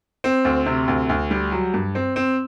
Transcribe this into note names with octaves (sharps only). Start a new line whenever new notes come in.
C4
D2
C3
D2
D2
G3
F#3
G2
C4
C4